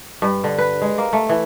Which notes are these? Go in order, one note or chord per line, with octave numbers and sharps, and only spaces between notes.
G2
D3
B4
G#3
A#3
A3
E3